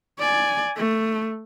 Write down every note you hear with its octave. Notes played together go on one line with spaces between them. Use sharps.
D5 G#5
A3